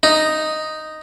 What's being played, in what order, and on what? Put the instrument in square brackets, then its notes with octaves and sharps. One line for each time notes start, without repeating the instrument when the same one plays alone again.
[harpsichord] D#4